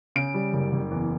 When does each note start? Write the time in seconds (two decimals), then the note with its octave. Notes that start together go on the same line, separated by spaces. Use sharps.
0.16 C#3 D7
0.34 G3
0.53 F#1
0.72 F#1
0.91 E2